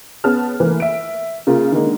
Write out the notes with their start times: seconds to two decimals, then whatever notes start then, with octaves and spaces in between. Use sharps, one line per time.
0.24 B3 C#4 G#4 A5 F6
0.60 E3 A3 A#3
0.80 E5 D7
1.47 C#3 A#3 F4
1.72 D3 D#3 G#3 A#3